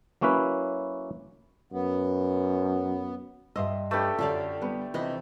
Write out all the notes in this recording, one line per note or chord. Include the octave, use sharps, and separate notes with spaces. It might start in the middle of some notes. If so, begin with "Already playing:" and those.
F#3 A#3 C#4 E4 B4
F#2 B3
G2 D#5 E5 C6 E6
A3 D4 G4 B4 C#6
F#2 D3 D4 F4 A4 D5 F5 A5
G3 B3 B4
C3 E3 F4 B4 D#5 B5